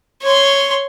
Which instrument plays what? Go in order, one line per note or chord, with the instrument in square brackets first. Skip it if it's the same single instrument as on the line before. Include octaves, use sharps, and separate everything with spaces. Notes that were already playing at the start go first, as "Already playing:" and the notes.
[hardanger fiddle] C#5 C6